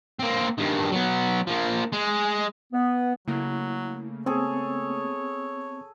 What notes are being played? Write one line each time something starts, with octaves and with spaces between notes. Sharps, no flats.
A#3 C4
G2 D#3
F#3 B3
F3 A#3
G#3
B3
C#3 F#3 A3 A#3 E4
B3 C4 G#4 A4 C#5